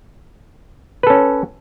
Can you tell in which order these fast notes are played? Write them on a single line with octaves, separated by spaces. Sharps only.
B4 A4 C#4